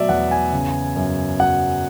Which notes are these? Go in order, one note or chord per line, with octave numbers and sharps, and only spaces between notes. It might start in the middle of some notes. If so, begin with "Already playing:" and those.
Already playing: B2 F#3 A3 D5 E5
E2 F#5
G#5
C#3
F#2
F#3 F#5